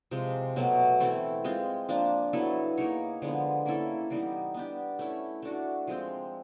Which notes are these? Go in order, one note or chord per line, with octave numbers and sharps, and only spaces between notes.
C3 F3 G#3
B2 F#3 A3
E3 A3 C4 E4
G#3 C4 F4
F3 A#3 D4
F#3 B3 E4 A4
A#3 D#4 G#4 C#5
D3 F3 G#3 B3
A#3 C#4 E4 A4
E3 G3 B3 D#4
B3 D4 G4
A3 C#4 E4
A3 D4 F#4
F3 G#3 C4